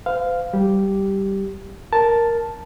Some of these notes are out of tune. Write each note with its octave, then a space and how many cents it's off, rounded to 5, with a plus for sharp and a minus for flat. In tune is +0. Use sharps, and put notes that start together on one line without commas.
C5 -40 F5 +0
G3 -10 G4 -5
A#4 +0 A5 +0